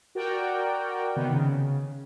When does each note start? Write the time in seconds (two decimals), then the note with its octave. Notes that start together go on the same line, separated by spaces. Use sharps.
0.15 F#4 A#4 D5 G5
1.16 C3 D#3 B3
1.33 C#3